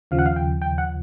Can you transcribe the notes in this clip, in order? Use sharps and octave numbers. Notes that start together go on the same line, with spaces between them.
D#2 C#3 F3 F5
F#5
F5
G5
G5
F#5